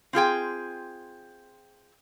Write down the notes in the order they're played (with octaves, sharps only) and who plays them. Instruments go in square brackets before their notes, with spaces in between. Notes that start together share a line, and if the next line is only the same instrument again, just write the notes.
[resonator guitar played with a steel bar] C4 F4 G#4 G5